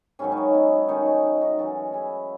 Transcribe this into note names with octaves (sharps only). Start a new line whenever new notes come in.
G#2 D#3 F#3 C#4 E4
C#4
D#4
C#4 E4
D#4
D#3 A3 C#4 D#4
C#4
D#4
D#4 F#4
F#2 E3 A3 C#4 F#4 A4
E4 G#4